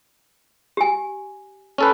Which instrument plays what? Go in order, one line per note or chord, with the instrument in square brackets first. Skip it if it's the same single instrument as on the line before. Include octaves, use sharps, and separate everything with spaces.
[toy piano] G4 G#5
[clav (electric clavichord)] C#4 A4 B4